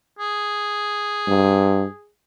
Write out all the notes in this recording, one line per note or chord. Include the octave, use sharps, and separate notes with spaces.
G#4
G2